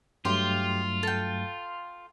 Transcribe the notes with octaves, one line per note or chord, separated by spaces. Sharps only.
G2 F#3 A3 F4 G4 G5 C6
A4 G5